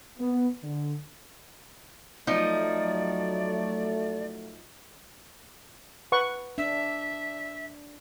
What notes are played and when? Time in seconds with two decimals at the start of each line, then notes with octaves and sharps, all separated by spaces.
0.19 B3
0.63 D3
2.27 F3 F#3 A3 D#4 D5
6.12 B4 F#5 C#6
6.58 D4 E5